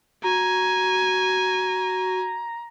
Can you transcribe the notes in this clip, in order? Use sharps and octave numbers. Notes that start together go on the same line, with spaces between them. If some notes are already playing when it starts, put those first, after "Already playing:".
F#4 G#5 A#5